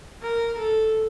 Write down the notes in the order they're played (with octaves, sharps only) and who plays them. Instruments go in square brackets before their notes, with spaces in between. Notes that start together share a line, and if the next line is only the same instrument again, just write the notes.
[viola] A#4
A4